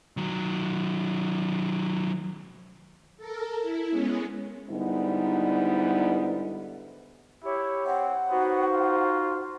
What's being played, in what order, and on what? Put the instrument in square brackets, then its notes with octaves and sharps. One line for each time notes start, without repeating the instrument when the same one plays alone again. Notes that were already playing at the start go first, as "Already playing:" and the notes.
[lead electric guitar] D#3 F#3
[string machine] A4 A#4
E4
G#3 B3 C#4
[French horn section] G#2 D3 G3 B3 D#4 E4
[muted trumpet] E4 [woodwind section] G4 C#5
[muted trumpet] C4 [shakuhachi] F#5
[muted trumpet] B3 [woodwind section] D#4 F#4 C5
[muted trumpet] F4